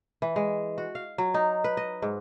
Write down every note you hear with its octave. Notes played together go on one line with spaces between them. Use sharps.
E3
G#3
F#4
F5
F#3
D#4
B4
D#5
G#2